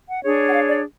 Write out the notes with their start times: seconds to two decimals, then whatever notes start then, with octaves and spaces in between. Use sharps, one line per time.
0.09 F#5
0.24 D4 G#4 C#5
0.49 F#5
0.54 F5
0.69 D5